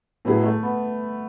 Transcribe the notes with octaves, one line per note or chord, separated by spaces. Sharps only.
A2 F#3 B3 E4 G#4
A3
B3